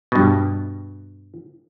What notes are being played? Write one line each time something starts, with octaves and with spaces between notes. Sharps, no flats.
G2 B2